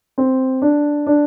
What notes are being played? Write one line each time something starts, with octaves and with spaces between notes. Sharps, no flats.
C4
D4
D4